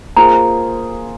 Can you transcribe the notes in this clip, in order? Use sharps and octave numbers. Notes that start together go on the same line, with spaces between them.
A#3 F4 G#4 C5 A#5